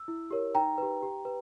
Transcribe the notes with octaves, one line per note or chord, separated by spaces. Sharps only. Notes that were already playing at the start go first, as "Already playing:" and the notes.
Already playing: E6
E4
G4 A#4 C#5
D#4 G5 A#5
G4 B4
G4
B4